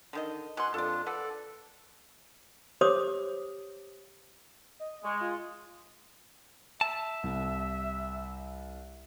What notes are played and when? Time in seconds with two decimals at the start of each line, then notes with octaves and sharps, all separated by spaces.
0.13 D3 D#3 D#5
0.57 B2 F#5 G#5 C6 F#6
0.74 F2 D4 F4 A4 D5
1.06 A4 B4 D5 F#5
2.81 G4 C5 C#5 D6 D#6
4.80 D#5
5.04 G#3 C#6
5.21 F4
6.81 E5 A5
7.23 C2